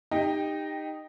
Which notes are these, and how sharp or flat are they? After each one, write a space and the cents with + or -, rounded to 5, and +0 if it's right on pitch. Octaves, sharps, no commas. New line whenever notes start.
D#4 -10 G4 +20 G5 +0